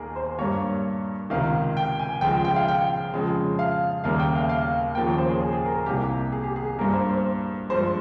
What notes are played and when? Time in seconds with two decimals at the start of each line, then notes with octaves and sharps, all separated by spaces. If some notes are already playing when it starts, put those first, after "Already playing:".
Already playing: D#2 D#3 A#3 G#4 A#4
0.16 C5
0.39 G2 G3 A#3 C#5
1.30 C#2 C3 D#3 F5
1.77 G5
1.99 G#5
2.21 C#2 C#3 F3 G#3 G5
2.45 G5
2.56 F5
2.68 G5
3.14 F2 C#3 F3 G#3
3.59 F5
4.04 D#2 C#3 G3 A#3 F5
4.20 G5
4.35 F5
4.49 F5
4.95 D#2 C#3 F3 A#3 G5
5.07 C#5
5.18 C5
5.29 G#4
5.41 G#4
5.53 G#4
5.65 A#4
5.75 A#4
5.86 C2 C3 G3 A#3 G4
6.32 G#4
6.44 G4
6.56 G#4
6.78 G2 G3 A#3 A#4
6.93 C5
7.09 C5
7.69 G2 F3 G#3 C5